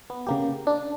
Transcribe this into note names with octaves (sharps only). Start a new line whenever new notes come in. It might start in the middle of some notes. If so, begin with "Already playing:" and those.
B3
C#3 A#3 G4
D4